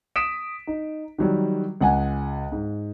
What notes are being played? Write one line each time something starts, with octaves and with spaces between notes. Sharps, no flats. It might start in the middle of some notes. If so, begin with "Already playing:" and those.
D#6 B6 D7 E7
D#4
D#3 F#3 G3
C#2 F#5 G#5
G#2